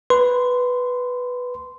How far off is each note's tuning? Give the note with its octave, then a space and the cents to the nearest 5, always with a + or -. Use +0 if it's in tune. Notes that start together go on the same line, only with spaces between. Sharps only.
B4 +0 C6 -15